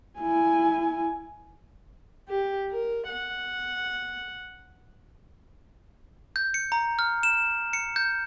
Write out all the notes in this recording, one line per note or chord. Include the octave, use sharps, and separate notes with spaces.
E4 G#5
G4
A#4
F#5
G6
C#7
A#5
F6
E7
C#7
G6